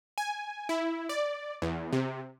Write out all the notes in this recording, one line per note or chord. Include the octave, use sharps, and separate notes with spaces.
G#5
E4
D5
E2
C3